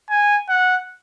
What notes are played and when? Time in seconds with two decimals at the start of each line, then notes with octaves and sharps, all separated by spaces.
0.10 G#5
0.49 F#5